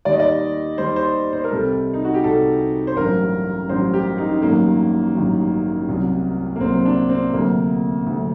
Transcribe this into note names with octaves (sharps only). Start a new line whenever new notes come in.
D#2 D#3 G3 D5
D#5
D5
D#2 D#3 G3 C5
C5
C5
A#4
C2 C3 G3 A4
D#4
F#4
G4
C2 C3 G3 A4
C5
A1 G2 F#3 A#4
A1 G2 F#3 C5
G4
D#4
A1 G2 D#3 F#3 A#3
A1 G2 D#3 F#3
C2 C3 F#3
A#3
C2 C3 F#3 C4
C4
D4
C4
D2 C3 F#3 A#3
D2 C3 F#3